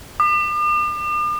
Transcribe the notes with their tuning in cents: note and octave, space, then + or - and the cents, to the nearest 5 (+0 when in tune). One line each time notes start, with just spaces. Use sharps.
D6 +45